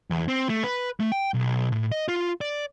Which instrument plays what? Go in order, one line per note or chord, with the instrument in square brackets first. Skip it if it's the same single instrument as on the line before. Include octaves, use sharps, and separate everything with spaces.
[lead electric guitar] E2
C4
A3
B4
A3
G5
B1
A2
D#5
F4
D5